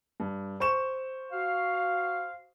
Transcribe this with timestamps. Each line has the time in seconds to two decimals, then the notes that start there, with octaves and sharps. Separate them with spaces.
0.20 G2
0.60 C5 C#6 E7
1.32 F#4 F5